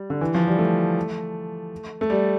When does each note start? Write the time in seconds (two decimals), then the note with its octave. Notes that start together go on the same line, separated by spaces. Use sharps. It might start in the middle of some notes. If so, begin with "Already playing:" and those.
Already playing: G3
0.10 D3
0.21 E3
0.34 F3
0.47 G3
0.59 A3
2.01 A3
2.10 G3